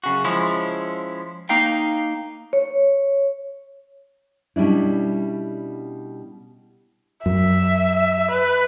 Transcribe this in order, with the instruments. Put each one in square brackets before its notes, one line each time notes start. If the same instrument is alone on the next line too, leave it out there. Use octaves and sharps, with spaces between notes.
[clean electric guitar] F#2 C#3 F#4
F3 G#3 C#4 E4
A#3 D#4 F5 G5
[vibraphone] C#5
[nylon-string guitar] B2 G3 C#4 D4 E4
[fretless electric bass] F#2 [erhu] E5
[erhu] B4